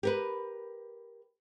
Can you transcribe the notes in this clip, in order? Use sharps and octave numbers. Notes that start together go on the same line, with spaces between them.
G4 A#4 B4